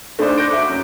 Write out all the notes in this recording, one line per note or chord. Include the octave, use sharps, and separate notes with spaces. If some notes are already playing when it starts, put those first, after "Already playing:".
A3 D4 D#4 A4 C5 D5
D6 F#6 G6 A#6 D7
F#4 E5 D6
F#2